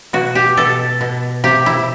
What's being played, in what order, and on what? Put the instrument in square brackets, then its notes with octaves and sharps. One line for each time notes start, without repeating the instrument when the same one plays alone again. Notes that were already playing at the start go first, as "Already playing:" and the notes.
[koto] B2 F#4
G4
B2 A4
B2
C3 G4
E4